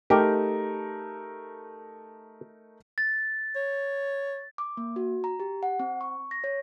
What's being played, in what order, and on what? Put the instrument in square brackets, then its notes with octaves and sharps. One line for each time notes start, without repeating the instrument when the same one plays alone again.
[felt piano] A3 D#4 A#4 [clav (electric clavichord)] G4 G5
[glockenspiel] A6
[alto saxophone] C#5
[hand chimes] D6
A#3
F#4
A#5
G4
F#5
C4
C#6
A#6
C#5